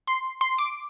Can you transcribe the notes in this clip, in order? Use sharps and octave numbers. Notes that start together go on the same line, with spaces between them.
C6
C6
D6